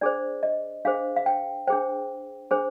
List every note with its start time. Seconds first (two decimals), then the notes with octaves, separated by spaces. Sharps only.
0.01 D4 G#4 C5 D5
0.43 D#5
0.85 D4 G#4 C5 F5
1.16 F5
1.26 G5
1.67 D4 G#4 C5 G5
2.51 D4 G#4 C5